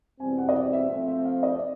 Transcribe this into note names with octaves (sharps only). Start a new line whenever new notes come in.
E2 B2 G3 C4 G#5
F#5
D#5
D5
E5
F3 A3 C4 E5
E5
F5
D#5
D5